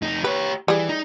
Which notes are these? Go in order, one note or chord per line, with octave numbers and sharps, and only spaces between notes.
F2 D#4
G4 B4 C#5
E3 G3 G#4
D#4